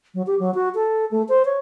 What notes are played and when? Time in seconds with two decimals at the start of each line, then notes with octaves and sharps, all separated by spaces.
0.15 F#3
0.27 G4
0.40 F#3
0.54 F#4
0.75 A4
1.11 A3
1.29 C5
1.45 C#5